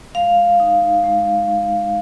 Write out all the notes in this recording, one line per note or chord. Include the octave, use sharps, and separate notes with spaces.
G#3 F5
D#4
G#3